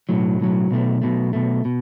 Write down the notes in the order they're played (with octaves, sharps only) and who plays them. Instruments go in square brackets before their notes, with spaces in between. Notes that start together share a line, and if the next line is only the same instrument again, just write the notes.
[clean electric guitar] B1 A2 F#3
B1 A2 F#3
B1 B2 A3
B1 B2 A3
B1 B2 A3
B2